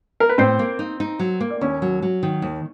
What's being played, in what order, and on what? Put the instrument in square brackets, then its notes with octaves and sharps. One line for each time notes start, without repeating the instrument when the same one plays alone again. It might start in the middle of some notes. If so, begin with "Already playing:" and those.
[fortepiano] A#4
B4
[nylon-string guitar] A2 [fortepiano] C4 C5
[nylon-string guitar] A#3
D#4
D#4
F#3
A#3
[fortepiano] D5
[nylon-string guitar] D#2 [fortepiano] C#4 C#5
[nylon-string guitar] F#3
F#3
D#3
D#2